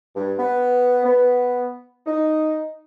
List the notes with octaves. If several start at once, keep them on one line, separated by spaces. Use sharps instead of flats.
G2
B3
B3
D#4